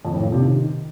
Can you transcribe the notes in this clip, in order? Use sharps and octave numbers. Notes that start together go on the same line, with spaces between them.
F2
A2
A#2
C3
D#3